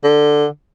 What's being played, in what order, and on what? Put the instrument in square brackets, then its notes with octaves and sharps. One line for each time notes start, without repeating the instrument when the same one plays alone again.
[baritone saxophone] D3